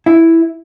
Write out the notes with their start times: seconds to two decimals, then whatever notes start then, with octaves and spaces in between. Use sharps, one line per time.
0.06 E4